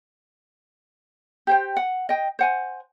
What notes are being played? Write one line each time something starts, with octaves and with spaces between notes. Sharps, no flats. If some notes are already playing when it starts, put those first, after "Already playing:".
G4 C5 G5
F#5
D#5 G5
C5 F#5 G#5